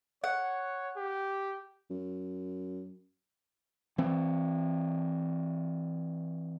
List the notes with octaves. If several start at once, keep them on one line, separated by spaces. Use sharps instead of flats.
C#5 F#5
G4
F#2
E3 C4